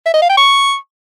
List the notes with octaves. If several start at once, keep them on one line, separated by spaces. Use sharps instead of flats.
E5
D#5
F5
G5
C#6